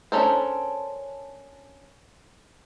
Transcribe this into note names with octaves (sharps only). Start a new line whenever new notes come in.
C#4 D4 A4 A#4 C5